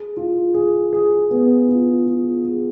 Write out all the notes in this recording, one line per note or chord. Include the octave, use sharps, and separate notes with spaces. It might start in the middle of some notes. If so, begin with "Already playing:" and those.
Already playing: G#4
F4
G#4
G#4
B3
F4
F4
G#4